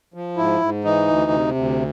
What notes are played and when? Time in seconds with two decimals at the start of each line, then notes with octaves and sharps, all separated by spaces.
0.14 F3
0.37 G#2 E4
0.61 G#2
0.84 E3 D#4
1.08 D2
1.31 C3
1.55 D2